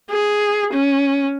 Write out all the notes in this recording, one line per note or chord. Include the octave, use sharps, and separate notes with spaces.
G#4
C#4